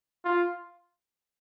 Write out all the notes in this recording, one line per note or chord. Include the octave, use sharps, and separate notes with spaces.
F4